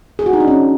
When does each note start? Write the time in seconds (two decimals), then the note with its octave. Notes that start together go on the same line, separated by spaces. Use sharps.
0.19 G#4
0.26 F#4
0.33 D#4
0.40 D4
0.48 C#4